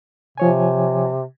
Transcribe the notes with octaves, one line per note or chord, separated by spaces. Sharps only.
C3 F3 C#5 G#5